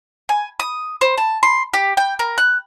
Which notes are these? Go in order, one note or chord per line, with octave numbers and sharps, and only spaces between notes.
G#5
D#6
C5
A5
C6
G4
G5
A#4
F#6